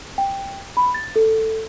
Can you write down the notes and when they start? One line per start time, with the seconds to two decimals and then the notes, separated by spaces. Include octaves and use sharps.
0.18 G5
0.77 B5
0.94 A6
1.16 A4